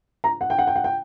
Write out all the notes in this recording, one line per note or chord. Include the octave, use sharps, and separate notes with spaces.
A#5
F#5
G5
F#5
G5
F#5
G5